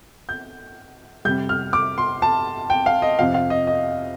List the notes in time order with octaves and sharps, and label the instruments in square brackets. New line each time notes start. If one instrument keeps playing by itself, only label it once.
[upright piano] G6
F2 C3 G3 G6
F6
D6
C6
A5
G5
F5
D#5
F2 C3 F3 F5
F5
D#5
D#5